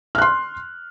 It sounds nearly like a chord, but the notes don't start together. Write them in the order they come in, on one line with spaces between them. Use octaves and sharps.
F6 F#6 C6